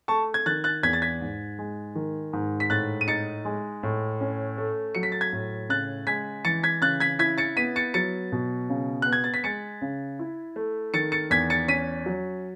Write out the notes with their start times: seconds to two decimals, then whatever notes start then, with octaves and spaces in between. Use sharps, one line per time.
0.08 A3 A5 C#6
0.34 G#6
0.46 D#3 F#6 A6
0.64 F#6 A6
0.83 E2 G#6 B6
0.93 A6
1.02 G#6 B6
1.21 G#2
1.59 G#3
1.95 D#3
2.33 G#2
2.60 B6
2.70 A2 F#6 A6
3.01 D#7
3.07 D#4 A6 C#7
3.45 G#3
3.83 A2
4.21 C#4
4.58 A3
4.95 F#3 C#7
5.03 B6
5.12 A6
5.21 G#6 B6
5.33 A2
5.69 C#3 F#6 A6
6.07 G#3 G#6 B6
6.45 E3 A6 C#7
6.63 G#6 B6
6.81 C#3 F#6 A6
7.00 G#6 B6
7.19 E4 G#6 B6
7.38 A6 C#7
7.56 B3 B6 D#7
7.76 A6 C#7
7.94 F#3 A6 C#7
8.32 B2
8.69 C#3
9.02 B3 F#6
9.13 G#6
9.24 A6
9.34 B6
9.44 G#3 A6 C#7
9.82 C#3
10.19 E4
10.56 A3
10.94 D#3 A6 C#7
11.12 A6 C#7
11.30 E2 G#6 B6
11.50 A6 C#7
11.68 C#4 B6 D#7
12.06 F#3